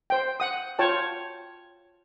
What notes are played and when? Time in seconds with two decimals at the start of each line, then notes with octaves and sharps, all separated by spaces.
0.10 C5 G5
0.40 F#5 D#6
0.79 F4 C#5 G5 A5